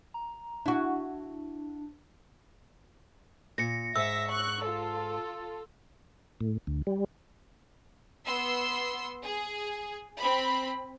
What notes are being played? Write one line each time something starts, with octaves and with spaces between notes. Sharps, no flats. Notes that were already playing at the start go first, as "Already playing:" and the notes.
A#5
D4 E4 F#4
A#2 A#6 C#7
G#2 E5 E6 A#6
C#6 F#6
F4 A4
A2
D2
G3
B3 C6 E6
G#4
C4 B5